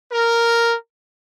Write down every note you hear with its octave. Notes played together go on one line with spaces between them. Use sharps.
A#4